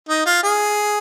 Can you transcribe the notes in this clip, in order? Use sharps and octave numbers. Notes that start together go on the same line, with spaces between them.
D#4
F4
G#4